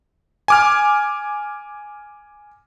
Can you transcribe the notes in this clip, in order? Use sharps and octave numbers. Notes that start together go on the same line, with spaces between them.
G#5 D6 F6